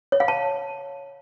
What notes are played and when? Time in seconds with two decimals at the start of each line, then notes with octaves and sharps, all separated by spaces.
0.12 C#5
0.20 F5
0.28 A5